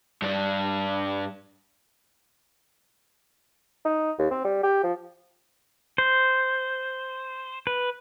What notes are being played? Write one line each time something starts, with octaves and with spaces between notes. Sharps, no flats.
G2 D4
D#4
D#2
C4
G3
G4
F3
C5
B4